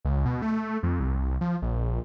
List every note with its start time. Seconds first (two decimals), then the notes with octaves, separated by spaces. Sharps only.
0.05 C#2
0.26 B2
0.42 A3
0.83 F2
1.00 C2
1.41 F3
1.62 A#1